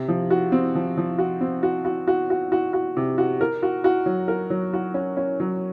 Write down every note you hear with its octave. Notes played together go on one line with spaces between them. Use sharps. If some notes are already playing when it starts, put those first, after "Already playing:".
Already playing: C3
F3
F#4
C4
F3
F3
F#4
C4
F#4
F#4
F#4
F#4
F#4
F#4
C3
F#4
A#4
F#4
F#4
F#3
A#4
F#3
F#4
C#4
C#4
F#3